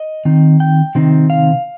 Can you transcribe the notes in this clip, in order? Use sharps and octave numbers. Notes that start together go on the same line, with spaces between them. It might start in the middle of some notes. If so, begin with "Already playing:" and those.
Already playing: D#5
D#3 C4 D#4
G5
C3 D#3 C4 D#4
F5